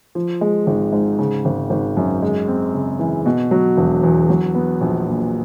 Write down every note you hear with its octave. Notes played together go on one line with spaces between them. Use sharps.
F3
G#3
G#1
G#2
C#3
G#1
G#1
F#2
G#3
C4
C#3
E3
B2
F#3
E1
E2
F#3
B3
A#1
A#2